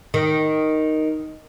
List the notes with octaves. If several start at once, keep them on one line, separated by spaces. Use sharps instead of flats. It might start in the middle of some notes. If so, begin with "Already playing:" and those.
D#3